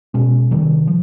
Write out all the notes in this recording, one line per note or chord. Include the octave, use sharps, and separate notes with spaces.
B2 G#3 C#4
C3 D#3 G3
F3